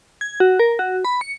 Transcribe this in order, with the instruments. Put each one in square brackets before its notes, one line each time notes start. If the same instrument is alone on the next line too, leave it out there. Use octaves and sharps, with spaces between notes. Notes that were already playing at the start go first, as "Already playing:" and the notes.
[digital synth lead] G#6
F#4
A#4
F#4
B5
C#7